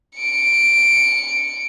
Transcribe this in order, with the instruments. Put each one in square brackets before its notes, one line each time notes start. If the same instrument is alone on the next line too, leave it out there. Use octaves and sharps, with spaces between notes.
[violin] C#7 D7